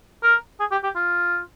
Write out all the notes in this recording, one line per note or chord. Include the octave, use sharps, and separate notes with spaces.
A#4
G#4
G4
G4
F4